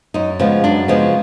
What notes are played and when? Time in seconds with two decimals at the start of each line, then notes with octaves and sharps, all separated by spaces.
0.14 F#2 D#4
0.39 C#3 F3 G#3 B3
0.64 F#2 D4
0.88 C#3 F3 G#3 B3